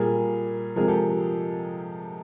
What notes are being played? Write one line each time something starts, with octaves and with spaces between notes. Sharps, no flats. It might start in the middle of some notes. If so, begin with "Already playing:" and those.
Already playing: A#2 G3 G#4 A#4
C3 F3 G#3 G#4 A#4
G4 A4